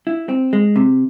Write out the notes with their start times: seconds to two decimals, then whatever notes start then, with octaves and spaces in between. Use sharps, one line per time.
0.07 E4
0.29 C4
0.53 G#3
0.76 C3